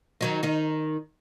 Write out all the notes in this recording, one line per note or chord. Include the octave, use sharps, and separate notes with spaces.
D#3 F#3 D#4
D#3 D#4